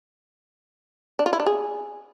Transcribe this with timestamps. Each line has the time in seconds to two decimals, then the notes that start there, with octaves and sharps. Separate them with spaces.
1.19 D4
1.26 F4
1.33 E4
1.40 D4
1.46 G#4